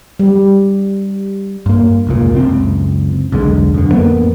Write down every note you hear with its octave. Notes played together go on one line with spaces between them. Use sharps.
G3
G2 A#3
F1 C#2 A#2
F#1 C#2 C4
B1 E2 D3 G#3
F#2 D3
A1 F2 A#3 B3